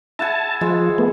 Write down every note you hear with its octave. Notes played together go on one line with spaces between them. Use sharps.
E4 F#5 G#5 A5
F3 G#3
A3 B3